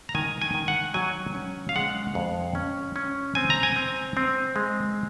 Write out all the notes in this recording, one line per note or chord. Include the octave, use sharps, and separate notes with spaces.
A#5
D#3 G#5
G#5
D#3
F#5
F#3 G#5
C#4
F5
G#3 F#5
F2
C#4
C#4
C4 G#5
A#5
G#5
C4
C4
G#3